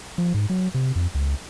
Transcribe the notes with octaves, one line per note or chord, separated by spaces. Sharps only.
F3
G#2
F#3
C3
F2
C#2